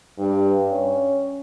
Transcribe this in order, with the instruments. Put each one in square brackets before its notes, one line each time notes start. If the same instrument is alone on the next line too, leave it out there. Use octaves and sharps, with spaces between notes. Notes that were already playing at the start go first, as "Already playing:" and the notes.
[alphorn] G2
C#4